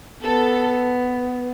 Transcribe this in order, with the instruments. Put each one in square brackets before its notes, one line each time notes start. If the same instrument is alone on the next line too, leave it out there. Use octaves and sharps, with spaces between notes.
[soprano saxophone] B3 [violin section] A4